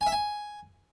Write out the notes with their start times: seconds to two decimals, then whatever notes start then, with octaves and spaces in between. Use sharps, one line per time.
0.01 G#5
0.07 E5
0.12 G#5